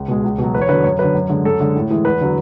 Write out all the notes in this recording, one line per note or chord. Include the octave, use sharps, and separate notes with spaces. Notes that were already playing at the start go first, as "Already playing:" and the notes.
Already playing: C#2
B2 G#3
C#2
B2 F#3
E2 B4
C#5
D3 F#3 B4
F#2 C#5
D3 F#3 B4
F#2
D3 G#3
F#2 A4
D3 G#3
A2
E3 G#3
E2 B4
D3 F#3